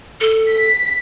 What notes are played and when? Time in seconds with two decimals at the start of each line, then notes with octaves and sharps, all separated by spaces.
0.21 A4
0.49 B6